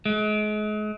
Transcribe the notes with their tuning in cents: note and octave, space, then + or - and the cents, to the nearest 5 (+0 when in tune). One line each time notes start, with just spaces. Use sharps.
G#3 +35